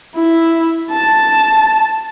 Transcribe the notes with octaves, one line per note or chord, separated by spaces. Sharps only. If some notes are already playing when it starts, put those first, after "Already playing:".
E4
A5